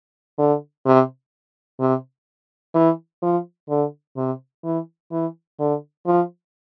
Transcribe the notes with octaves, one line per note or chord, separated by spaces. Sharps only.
D3
C3
C3
E3
F3
D3
C3
E3
E3
D3
F3